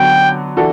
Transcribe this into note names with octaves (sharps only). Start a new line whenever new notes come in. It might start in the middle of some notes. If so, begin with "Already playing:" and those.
Already playing: D3 F#3 B3 F#4 G5
E3 D4 F#4 A4